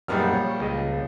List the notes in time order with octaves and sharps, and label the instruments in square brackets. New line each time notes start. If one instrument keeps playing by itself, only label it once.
[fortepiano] A#1 G3 F6 [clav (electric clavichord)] F#2 B3 D#4
[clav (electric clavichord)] C#5
C#2 D#5